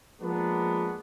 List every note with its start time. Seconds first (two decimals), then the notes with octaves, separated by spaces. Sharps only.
0.20 F3 G#3 A#3 B3 D4 F#4